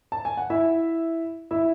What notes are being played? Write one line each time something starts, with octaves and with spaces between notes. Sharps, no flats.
A5
G#5
F#5
E4 E5
E4 E5